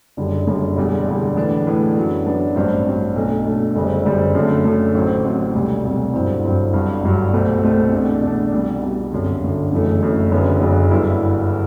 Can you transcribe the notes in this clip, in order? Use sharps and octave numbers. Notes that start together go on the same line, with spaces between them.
F#1 F#2 D3 G3
F#1 F#2 D3 G3
E1 E2 D3 G3
E1 E2 D3 G3
A2 E3 B3 D4
A2 E3 B3 D4
F#2 F#3 B3 D4
F#2 F#3 B3 D4
A1 G2 F#3 C4
A1 G2 F#3 C4
B1 B2 A3 D4
B1 B2 A3 D4
F#1 F#2 D3 G3 C4
F#1 F#2 D3 G3 C4
F#2 D3 A3
F#2 D3 A3
A1 A2 F#3 C4
A1 A2 F#3 C4
E1 D2 C3 G3
E1 D2 C3 G3
G1 G2 F#3 C4 E4
G1 G2 F#3 C4 E4
G1 G2 F#3
G1 G2 F#3
C2 B2 A3 C4
C2 B2 A3 C4
E2 B2 A3 D4
E2 B2 A3 D4
C2 B2 G3
C2 B2 G3
G1 F#2 D3
G1 F#2 D3
F#1 F#2 E3 A3
F#1 F#2 E3 A3
F#1 F#2 D3 F#3 B3
F#1 F#2 D3 F#3 B3
G1 G2 F#3 B3 E4